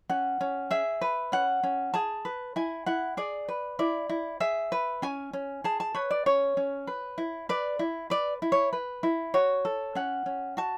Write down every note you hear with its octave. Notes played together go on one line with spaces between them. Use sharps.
C#4 F#5
C#4
G#4 E5
B4
C#4 F#5
C#4
G#4 A5
B4
E4 G#5
E4 F#5
G#4 D5
B4
E4 D5
E4
G#4 E5
B4
C#4 G#5
C#4
G#4 A5
A5
B4 C#5
D5
C#4 C#5
C#4
B4
E4
B4 D5
E4
B4 D5
E4
C#5
B4
E4
F#4 C#5
A4
C#4 F#5
C#4
F#4 A5